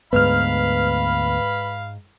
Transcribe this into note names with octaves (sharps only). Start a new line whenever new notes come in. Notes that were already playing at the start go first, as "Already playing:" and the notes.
D2 G#2 B3 B4 F5 B5 F6